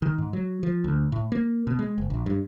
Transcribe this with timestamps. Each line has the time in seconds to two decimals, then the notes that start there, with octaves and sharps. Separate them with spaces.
0.02 D#3
0.18 G#2
0.33 F#3
0.63 F3
0.84 D2
1.12 A2
1.32 A#3
1.67 B2
1.79 G#3
1.98 F#1
2.10 A#1
2.26 G2